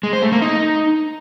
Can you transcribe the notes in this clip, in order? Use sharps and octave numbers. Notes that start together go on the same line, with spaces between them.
G#3
C5
A3
A#3
D#4